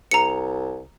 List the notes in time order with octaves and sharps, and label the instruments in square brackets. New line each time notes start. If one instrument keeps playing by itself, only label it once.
[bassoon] C2 [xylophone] A#5 C#7